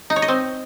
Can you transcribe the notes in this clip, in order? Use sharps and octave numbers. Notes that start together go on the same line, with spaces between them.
D#4
C#5
D#5
C4